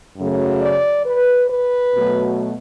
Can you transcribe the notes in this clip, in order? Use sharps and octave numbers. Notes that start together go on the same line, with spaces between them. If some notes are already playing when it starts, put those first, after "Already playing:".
F#2 C#3 F#3 A3
D5
B4
B4
B2 F#3 A3